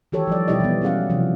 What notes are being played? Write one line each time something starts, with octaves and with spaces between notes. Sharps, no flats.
D#3 E3 G4 A4 C#5
F3 G3 D5
B2 G3 E4 G4 D5 D#5
E3 B3
F#3 C#4 G#4 F5 F#5
C3 E3 F3